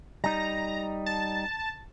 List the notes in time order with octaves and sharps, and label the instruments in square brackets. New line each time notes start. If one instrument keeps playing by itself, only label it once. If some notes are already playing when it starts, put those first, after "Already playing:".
[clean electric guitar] G3 D#4 [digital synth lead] A#5
[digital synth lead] A5